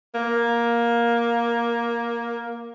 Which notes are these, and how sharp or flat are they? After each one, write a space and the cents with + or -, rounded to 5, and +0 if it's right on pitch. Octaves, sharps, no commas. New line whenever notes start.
A#3 +10